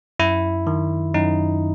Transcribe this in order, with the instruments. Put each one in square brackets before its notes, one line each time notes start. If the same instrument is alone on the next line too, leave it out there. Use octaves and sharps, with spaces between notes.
[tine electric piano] F#2 E4
D#3
F#2 D#4